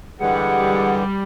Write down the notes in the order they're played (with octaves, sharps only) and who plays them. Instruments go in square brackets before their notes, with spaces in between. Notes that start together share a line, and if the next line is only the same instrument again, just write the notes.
[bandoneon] D3 E3 [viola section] G3 [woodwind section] G#3 G#4 F#5